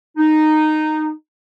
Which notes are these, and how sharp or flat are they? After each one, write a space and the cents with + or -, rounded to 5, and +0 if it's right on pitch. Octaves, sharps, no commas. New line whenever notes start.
D#4 -10